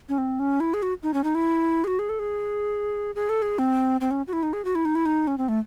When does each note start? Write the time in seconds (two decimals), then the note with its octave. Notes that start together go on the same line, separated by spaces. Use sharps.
0.09 C#4
0.18 C4
0.40 C#4
0.60 E4
0.74 G#4
0.82 F#4
1.03 D#4
1.14 C#4
1.24 D#4
1.35 E4
1.84 G#4
1.87 F#4
1.99 G#4
2.09 A4
2.19 G#4
3.15 G#4
3.29 A4
3.42 G#4
3.59 C4
4.01 C4
4.11 C#4
4.27 F#4
4.33 E4
4.43 D#4
4.53 G#4
4.65 F#4
4.75 E4
4.85 D#4
4.95 E4
5.06 D#4
5.27 C#4
5.38 C4
5.48 A3